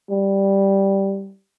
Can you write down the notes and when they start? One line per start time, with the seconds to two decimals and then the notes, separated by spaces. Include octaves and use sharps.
0.10 G3